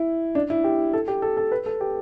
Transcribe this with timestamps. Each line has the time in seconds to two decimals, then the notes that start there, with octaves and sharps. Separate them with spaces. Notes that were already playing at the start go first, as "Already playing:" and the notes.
Already playing: E4
0.35 D4
0.50 E4
0.64 G4
0.93 A4
1.08 G4
1.22 A4
1.37 A4
1.52 B4
1.66 A4
1.81 G4